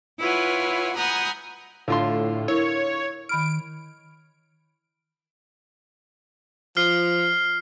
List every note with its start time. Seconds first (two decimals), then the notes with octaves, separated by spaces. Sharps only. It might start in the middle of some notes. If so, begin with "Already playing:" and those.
0.19 E4 F4 B4 C#5 F#5 G#5
0.95 F#5 G#5 A#5 B5 D#6 G6
1.88 A2 D3 F4 C6
2.48 E4 A#4 C#5
3.29 D#3 B5 F6 D7
6.77 F3 F6 C7